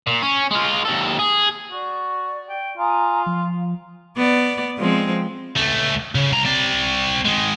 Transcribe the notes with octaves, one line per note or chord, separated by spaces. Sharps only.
A#2
C#4
G#3 F4
D#2 A4
G#4
F#4 D5
G5
F4 G#5 A#5 D#6
F3 F5
B3 D5
F3 G#3 C4
C#2 A3
C#3
C2 A#5
C4 D5
D#3 G#3